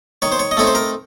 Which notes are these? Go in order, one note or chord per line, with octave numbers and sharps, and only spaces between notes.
D#3 C#5
C5
C#5
D#5
A3 C4 D#4 C#5
C5
A#4